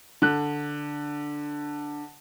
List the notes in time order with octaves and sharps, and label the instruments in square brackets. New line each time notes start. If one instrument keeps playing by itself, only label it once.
[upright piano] D3 F#6